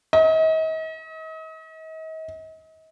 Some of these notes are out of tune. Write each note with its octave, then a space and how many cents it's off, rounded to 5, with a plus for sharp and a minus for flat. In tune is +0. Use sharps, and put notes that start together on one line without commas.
D#5 +40